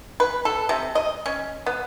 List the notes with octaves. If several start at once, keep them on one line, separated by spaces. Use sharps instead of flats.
B4
A4
C3
D#5
C#4
B3